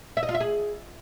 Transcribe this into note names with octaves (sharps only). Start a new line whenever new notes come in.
E5
D#5
F4
E5
G#4